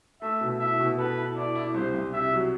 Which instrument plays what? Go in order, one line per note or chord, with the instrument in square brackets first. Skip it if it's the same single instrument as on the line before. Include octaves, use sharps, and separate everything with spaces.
[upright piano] A3 [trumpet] E5
[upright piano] B2
[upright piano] E4 [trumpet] E5
[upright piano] B2
[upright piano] A4 [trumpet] B4
[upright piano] E4
[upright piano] E4 [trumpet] D5
[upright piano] E4
[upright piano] C2 [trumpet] C5
[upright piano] C2
[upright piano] C3 [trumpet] E5
[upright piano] F#3